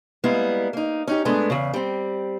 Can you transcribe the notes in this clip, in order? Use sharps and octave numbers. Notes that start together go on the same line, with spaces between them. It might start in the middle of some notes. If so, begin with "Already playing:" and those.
G3 G#3 A#3 B3 E4
A#3 D#4
C#4 D#4 G4
G#2 G#3 A3 B3 D4
E2 C#3
G3 C4